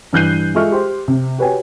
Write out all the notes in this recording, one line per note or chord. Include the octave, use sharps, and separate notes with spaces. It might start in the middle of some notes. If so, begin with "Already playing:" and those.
G2 E3 F#6 G6 C7 D#7
G#3 F4 A4 E5 C#6 F6
G4 C5 C6
C3 C4
F#4 G4 B4 C#5 G5 G#5